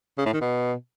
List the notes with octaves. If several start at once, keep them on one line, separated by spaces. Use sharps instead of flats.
C#3
A2
D#3
B2